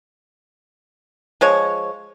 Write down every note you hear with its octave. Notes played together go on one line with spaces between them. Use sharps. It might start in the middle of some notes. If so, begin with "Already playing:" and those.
F3 G#3 C#5